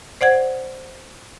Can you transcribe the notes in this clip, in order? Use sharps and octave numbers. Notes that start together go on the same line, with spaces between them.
C5 D5 F#5 G#6